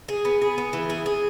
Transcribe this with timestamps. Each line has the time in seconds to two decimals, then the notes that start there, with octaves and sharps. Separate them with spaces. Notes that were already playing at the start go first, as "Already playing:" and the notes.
0.09 G#4
0.25 B3
0.42 G#4
0.58 B3
0.73 E3
0.90 G#4
1.06 G#4